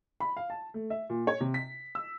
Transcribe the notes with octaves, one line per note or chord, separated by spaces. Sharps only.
B5
F5
A5
A3
E5
A#2
C#5
C3
B6
E6